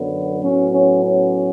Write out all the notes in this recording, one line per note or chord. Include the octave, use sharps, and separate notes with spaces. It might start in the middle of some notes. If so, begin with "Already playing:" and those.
Already playing: F#2 D3 F#3 B3
A2 F#3 B3 C#4
C#4
C#4